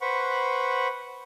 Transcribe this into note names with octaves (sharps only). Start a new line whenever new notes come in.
B4 C5 F#5 B5 C#6